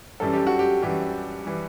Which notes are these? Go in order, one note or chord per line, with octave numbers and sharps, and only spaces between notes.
F#2 E3 G3 A4
G4
F#4
G4
F#2 E3 G3 G4
E3 G3